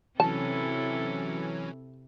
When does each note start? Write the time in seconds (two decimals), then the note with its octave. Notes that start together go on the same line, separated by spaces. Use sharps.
0.20 C3 E3 F#3 C#4 E4 A4 A5